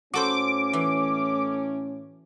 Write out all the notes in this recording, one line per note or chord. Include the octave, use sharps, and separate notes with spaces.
A2 A3 C#4 F#4 A4 C5 D6
E3